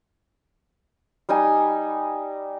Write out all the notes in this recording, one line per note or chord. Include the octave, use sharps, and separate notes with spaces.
G3 D#4 G#5